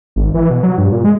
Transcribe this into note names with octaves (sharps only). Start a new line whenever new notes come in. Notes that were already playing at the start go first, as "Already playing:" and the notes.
G#1
E3
B2
F#3
G2
A#2
G#3